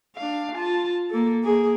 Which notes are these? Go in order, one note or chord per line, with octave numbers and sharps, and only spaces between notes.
D4 F5
F4 A5
A#3 A4
A#3 G#4